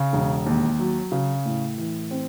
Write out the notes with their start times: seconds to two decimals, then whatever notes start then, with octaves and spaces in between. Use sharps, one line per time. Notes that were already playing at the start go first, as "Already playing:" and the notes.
Already playing: C#3
0.13 E1
0.46 D#2
0.79 F#3
1.12 C#3
1.45 A2
1.78 E3
2.11 C4